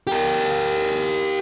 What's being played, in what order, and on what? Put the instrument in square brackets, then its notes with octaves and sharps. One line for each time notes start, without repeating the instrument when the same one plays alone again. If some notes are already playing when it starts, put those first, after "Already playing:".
[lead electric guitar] G4 A#4